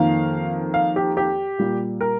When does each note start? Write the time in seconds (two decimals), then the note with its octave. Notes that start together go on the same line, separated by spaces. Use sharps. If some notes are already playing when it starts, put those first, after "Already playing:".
Already playing: F2 D#3 A#3 F5
0.74 F5
0.96 G4
1.17 G4
1.59 A#2 G3 A#3
2.01 A#4